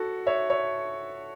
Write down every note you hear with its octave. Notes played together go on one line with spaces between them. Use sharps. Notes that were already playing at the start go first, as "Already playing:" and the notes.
Already playing: F#4 A4
C#5 E5
C#5 E5